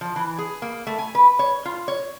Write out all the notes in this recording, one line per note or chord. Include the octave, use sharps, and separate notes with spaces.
F3
E3
G#4
A#3
A3
G#5
B4
C#5
F4
C#5